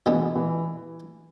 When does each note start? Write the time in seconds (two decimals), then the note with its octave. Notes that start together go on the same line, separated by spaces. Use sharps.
0.06 B2 E3 G#3 B3 D4
0.35 E3